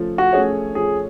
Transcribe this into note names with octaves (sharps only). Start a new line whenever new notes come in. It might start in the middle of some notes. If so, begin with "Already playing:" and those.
Already playing: F3 A3 C#4
F#4
A3 C#4 G#4 C#5
F3 G#4